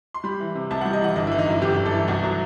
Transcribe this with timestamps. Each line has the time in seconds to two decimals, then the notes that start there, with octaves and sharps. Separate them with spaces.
0.14 C6
0.24 G3 B5
0.40 E3
0.55 C3
0.71 C2 A5
0.81 F#5
0.85 G3
0.93 D#5
1.01 E3 F#5
1.15 G1 D#5
1.27 E4
1.31 E3
1.38 D#4
1.46 F#2 E4
1.61 G1 G4
1.77 G1
1.86 A4
1.93 E3
2.08 C2 F#4
2.24 F#3